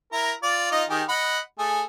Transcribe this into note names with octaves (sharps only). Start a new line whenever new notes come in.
E4 A#4 A#5
F4 D5
D#4 F4 D#5
D#3 G4 G#4
D#5 F#5 B5
A3 G#4